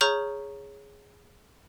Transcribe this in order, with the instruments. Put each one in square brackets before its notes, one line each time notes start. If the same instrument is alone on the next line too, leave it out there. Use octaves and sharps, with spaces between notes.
[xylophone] G#4 C#5 A#5 C#6 F6 G6